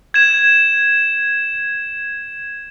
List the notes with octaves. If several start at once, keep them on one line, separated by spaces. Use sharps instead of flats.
G#6 E7